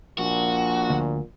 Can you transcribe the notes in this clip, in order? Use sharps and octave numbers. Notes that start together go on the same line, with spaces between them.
A#1 A#2 F#4
D2